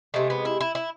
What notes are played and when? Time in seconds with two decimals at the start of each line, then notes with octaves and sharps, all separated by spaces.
0.14 C3 G#3 A3
0.30 B3
0.45 E4
0.61 E4
0.75 E4